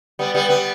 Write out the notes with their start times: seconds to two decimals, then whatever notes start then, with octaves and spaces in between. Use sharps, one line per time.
0.19 G3 B3
0.35 G3 B3
0.49 G3 B3